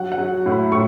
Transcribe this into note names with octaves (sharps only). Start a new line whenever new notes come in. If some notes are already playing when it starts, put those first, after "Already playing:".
Already playing: F#3 F#5
F#5
F#3
A2
B5
A2 C#6